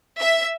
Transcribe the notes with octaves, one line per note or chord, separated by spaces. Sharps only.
E5